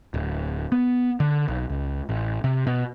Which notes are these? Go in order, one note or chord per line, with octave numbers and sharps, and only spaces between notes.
D1
B3
D3
B1
C#2
A1
C3
B2